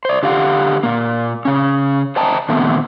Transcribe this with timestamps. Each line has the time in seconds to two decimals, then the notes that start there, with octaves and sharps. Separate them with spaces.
0.05 C5 D5
0.23 D3 G4 A4 F5 F#5
0.83 A#2 A#3
1.45 C#3 C#4
2.16 C5 D#5 E5 G5 A5 A#5
2.49 A#2 D3 D#3 A3 B3 C4